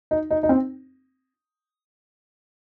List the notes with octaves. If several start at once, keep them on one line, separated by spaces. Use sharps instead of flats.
D#4
D#4
D#4
C4